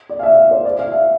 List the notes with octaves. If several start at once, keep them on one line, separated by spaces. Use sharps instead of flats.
D5
F5
E5
D5
C5
D5
F5
E5